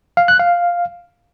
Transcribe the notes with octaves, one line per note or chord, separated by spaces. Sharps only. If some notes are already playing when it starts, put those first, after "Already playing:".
F5
F#6
F5